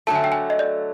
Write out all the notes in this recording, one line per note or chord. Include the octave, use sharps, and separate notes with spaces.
D3 F#3 A3 A5
G#5
G5
G#5
D#5
D5